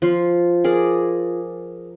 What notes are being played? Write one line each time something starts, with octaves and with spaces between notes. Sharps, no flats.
F3 F4
G#4 A#4 D5